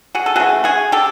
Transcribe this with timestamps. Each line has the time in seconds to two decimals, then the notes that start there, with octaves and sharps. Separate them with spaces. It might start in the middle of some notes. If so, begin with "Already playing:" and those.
0.15 F#4 G#4
0.26 A4
0.36 C#3 E3 A3 F#4 G#4
0.64 F#4 G#4
0.92 G4 A4